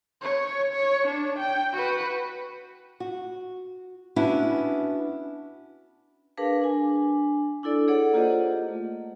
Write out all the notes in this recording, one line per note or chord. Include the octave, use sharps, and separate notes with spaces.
C#5
C#5
D4
G5
F#4 B4
F#4
B3 C#4 D4 E4 F#4
D4 G#4 A#4 B4 F5 A5
D4 G#5
D4 E4 A4 D5
G#4 A4 C#5 D5 F#5
A#3 F4 G4 C5 D#5 F#5
A3